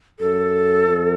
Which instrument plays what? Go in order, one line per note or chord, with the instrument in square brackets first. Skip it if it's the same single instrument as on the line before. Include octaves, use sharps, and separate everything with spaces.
[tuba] F#2 [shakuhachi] A4
[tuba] F2